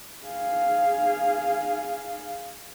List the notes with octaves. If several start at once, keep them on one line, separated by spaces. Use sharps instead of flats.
G#4 F5